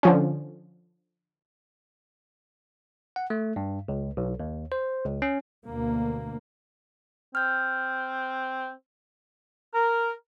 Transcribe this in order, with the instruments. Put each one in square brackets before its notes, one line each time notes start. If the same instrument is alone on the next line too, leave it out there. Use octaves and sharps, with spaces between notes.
[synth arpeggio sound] D3 F3 C#4
[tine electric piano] F#5
A3
G2
C#2
B1
D#2
C5
C#2
C#4
[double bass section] D2 B2 A#3
[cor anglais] C4 [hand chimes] F6 G6
[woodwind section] A#4